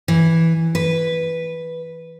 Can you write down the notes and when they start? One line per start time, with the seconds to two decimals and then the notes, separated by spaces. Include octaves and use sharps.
0.08 E3
0.75 B4